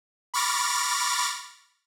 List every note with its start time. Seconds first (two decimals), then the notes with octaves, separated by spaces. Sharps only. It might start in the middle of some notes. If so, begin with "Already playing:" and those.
0.34 B5 C#6 D6 F6 A6 A#6